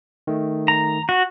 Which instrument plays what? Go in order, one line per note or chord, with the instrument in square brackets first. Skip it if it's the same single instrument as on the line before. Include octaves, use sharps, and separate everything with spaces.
[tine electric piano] D#3 A3
[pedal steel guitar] A#5
F#4